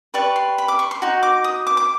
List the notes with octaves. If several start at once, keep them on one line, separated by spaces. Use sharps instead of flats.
G4 B4 D5 C#6
C6
B5
D6
C#6
C6
D#4 F#4
D6
D#6
D6
D6